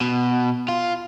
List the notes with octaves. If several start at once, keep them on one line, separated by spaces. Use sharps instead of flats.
B2
F4